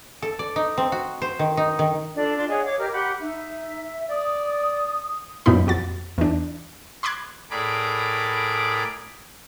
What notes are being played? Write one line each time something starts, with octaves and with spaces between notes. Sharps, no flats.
A4
D5
D#4
C4
F#4
C5
D#3
D#4
D#3
D4 F4 A4
D4 F4 C6 D6
G#4 C#5 D#5 F#5
C#5 F5 D6
G4 A#4 D#5 F6
G4 F#5 B5 C6
D#4 E5
D5 D#6
F#2 A#2 E3 B3 D#4 B5
F2 F#4 A6
E2 D4
B5 C6 D6 F#6 G#6
A2 G#4 A#4 D5 B5 D6